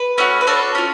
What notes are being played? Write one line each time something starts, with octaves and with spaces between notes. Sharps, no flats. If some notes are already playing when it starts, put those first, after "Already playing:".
Already playing: B4
A3 C#4 F#4
B4
D4 F#4 A4 C#5
C#4 F4